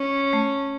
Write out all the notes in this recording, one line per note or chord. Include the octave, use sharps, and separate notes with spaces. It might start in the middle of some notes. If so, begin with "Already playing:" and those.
Already playing: C#4
A3